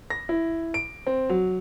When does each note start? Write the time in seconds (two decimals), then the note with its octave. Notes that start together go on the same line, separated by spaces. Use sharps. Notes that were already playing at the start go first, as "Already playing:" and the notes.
0.10 A#6
0.29 E4
0.74 D7
1.07 C4
1.30 F#3